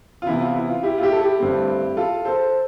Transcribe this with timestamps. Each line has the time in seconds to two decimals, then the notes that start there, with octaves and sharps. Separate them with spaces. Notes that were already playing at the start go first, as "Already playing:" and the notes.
0.22 F4
0.26 C3 E3 B3 E4
0.41 F4
0.56 E4
0.70 F4
0.83 E4 G4
0.98 F4
1.03 E4 G4
1.12 A4
1.21 E4 G4
1.40 G2 D3 A3 C4
1.97 F4 A4
2.25 A4 C5